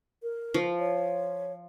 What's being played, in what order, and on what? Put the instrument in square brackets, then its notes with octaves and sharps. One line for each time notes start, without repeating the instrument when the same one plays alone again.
[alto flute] A#4
[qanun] F3
[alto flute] C#5